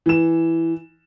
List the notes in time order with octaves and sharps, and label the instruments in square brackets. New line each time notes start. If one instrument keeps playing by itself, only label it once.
[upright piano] E3 E7